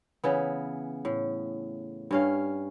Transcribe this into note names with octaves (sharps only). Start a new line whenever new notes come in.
C#3 E3 B3
A2
G2 C#4 F5